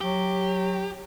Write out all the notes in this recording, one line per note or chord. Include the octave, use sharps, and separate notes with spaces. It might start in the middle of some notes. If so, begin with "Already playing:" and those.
F#3 G4